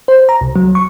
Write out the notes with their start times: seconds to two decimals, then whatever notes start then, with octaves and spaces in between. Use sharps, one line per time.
0.08 C5
0.29 A#5
0.41 C2
0.56 F#3
0.75 C#6